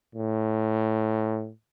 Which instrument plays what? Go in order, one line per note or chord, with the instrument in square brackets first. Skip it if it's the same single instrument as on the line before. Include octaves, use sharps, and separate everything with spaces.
[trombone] A2